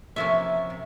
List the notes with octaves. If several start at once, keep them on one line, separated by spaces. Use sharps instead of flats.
C3 F3 A#3 C#4 E5
C3